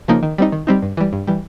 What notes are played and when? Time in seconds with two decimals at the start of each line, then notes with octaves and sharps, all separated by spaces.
0.08 C#3 F3 A#3 D#4
0.23 D#3
0.38 G3 C4 D#4
0.52 D#3
0.67 G3 C4 D#4
0.82 G2
0.97 E3 G3
1.13 G2
1.27 E3 G3